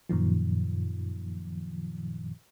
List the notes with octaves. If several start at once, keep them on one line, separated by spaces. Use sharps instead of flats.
F#2 A#2 D#3 F3